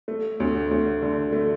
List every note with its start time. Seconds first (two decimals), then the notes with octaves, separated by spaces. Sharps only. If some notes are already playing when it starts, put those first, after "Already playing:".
0.08 A3
0.40 D2
0.71 D2
1.02 D3
1.32 A3